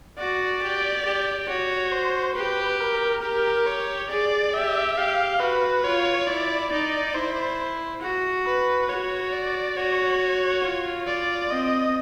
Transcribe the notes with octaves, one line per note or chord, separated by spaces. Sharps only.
F#4 D5
G4
G4
F#4 C#5
C5
G4 B4
A#4
G4 A#4
C#5
G#4 D5
G4 E5
G4 F5
F#4 B4
F4 C#5
E4 D5
D#4 D5
E4 C5
F#4
B4
F#4 C#5
D5
F#4 C#5
F4
D5
C4 D#5